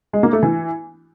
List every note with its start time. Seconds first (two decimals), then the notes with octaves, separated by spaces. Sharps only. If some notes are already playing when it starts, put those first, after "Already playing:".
0.13 G#3
0.23 A#3
0.33 A3
0.43 E3